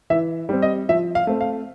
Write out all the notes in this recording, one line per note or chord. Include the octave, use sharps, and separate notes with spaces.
E3 E5
G3 C4
D#5
F3 E5
F5
A3 C4
F5